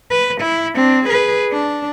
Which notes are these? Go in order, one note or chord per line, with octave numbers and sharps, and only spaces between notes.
B4
E4
C4 D4
G#4 B4
D4